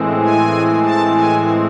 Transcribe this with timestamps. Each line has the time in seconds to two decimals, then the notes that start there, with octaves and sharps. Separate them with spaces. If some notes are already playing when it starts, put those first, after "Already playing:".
Already playing: A2 E3 G#3 C4
0.20 G#5
0.82 A5
1.13 G#5